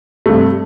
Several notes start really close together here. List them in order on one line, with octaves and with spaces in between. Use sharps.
A3 G2 C3